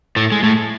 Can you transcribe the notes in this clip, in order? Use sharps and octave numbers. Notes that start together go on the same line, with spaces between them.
A2 A3
G#3
A2 A3